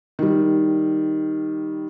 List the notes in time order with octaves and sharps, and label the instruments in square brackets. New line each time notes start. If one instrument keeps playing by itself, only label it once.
[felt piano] D#3 G3